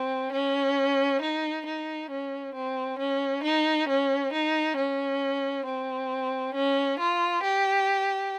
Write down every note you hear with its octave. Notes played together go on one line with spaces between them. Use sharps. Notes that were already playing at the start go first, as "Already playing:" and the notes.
Already playing: C4
C#4
D#4
D#4
C#4
C4
C#4
D#4
C#4
D#4
C#4
C4
C#4
F4
G4